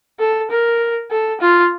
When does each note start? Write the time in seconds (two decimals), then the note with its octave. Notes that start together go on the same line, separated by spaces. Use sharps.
0.19 A4
0.50 A#4
1.11 A4
1.41 F4